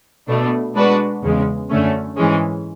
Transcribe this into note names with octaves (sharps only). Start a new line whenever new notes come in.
B2 A3 D4
G#3 D4 F#4 B4
E2 C#3 G#3
F#2 D3 A3 C#4
G#2 E3 G#3 C#4